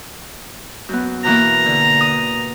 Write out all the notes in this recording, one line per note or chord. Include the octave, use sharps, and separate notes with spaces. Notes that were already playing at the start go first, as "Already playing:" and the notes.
F#2 B3
B2 E3 A#3 A#5
D3
D#6